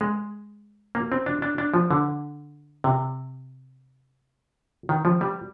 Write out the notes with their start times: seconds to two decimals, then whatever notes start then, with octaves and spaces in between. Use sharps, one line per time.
0.01 G#3
0.95 A#3
1.12 C4
1.26 D4
1.42 D4
1.58 D4
1.74 F3
1.91 D3
2.84 C3
4.89 D#3
5.05 F3
5.21 G3